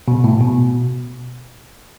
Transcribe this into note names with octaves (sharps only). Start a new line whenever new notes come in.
B2
A2
B2